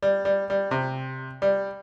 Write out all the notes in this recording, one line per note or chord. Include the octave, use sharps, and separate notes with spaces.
G3
G3
G3
C3
G3